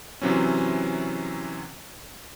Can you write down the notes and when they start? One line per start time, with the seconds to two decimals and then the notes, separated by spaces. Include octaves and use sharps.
0.22 C3 E3 F#3 C4 C#4